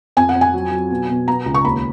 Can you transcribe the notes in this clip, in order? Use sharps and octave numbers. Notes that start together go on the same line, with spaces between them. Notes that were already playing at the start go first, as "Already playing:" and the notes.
F2 G#5
F#5
F2
G#5
F#3
F#3
B2
B2
B3 A#5
C#2
C#6
D#2 B5